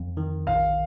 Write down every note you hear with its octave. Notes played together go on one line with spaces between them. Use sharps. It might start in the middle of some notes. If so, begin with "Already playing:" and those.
Already playing: F2
D#3
A#1 F5